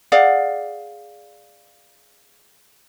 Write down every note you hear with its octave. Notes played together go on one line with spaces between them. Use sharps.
G#4 D5 F5 F#5